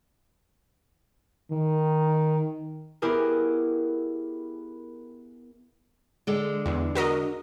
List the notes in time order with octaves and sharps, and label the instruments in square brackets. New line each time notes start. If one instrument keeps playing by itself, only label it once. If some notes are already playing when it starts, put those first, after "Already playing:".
[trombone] D#3
[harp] B3 E4 G4 G#4 A#4
[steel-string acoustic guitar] D3 G#3
[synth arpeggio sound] E2
F#4 A#4 D#5